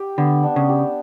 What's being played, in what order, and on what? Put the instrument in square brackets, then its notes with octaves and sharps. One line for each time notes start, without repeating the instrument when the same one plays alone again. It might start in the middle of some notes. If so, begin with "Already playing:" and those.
Already playing: [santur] G4
[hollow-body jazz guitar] D3 [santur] B3
[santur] D4
[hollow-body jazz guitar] C#3
[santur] G4